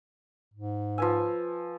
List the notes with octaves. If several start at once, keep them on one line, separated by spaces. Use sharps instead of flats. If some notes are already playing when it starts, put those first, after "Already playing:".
G#2
F3 F4 B4 G#5 E6